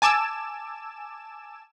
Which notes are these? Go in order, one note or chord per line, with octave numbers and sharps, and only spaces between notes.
G#5 A5 D6 E6 E7